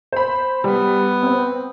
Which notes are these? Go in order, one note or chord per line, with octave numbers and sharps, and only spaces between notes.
C5 B5
G3 B3
C4 C5